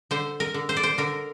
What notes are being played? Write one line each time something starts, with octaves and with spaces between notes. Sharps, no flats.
D3 C5
A#4
D3
C5
D5
C5
D3 A#4